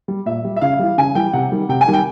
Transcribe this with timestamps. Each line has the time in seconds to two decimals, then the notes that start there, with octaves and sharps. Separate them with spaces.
0.08 G3
0.26 A#2 E5
0.44 G3
0.56 E5
0.61 C#3 F5
0.79 E3 G3
0.98 C#3 G#5
1.15 E3 G3 G5
1.33 C3 F#5
1.52 D#3 G3
1.69 C3 G5
1.81 G#5
1.87 D#3 G3
1.93 G5